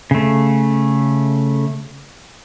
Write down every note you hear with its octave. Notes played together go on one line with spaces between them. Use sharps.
C#3 A3